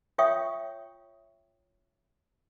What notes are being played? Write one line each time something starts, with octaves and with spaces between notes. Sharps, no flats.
F4 C#5 E5 G5 C#6 D#6